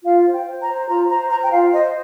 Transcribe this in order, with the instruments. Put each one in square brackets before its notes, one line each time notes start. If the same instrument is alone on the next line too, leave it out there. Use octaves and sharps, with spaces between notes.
[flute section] F4 F5
C5
G5
C5
A#5
C5
F4 A#5
C5 A#5
C5 A#5
G5
F4 F5
C5 D#5